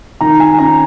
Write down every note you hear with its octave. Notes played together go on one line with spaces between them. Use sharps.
D#3 A#5
G#5
C#4 A#5